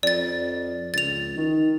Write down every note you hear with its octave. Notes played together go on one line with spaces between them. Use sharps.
F2 D5 A6
C#2 A6 F7
D#3